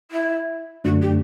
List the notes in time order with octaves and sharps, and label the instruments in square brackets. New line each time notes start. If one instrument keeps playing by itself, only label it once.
[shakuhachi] E4
[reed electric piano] F#2 D3 A3 D4 [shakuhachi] F#4
[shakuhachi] G4